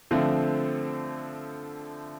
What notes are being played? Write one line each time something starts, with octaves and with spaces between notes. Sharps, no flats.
D3 F3 A3 C4